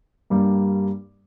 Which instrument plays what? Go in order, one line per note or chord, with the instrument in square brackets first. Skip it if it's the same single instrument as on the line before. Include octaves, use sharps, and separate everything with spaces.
[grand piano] G2 G3 A#3